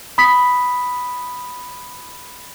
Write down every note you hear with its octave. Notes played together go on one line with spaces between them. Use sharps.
B5 D#6 B6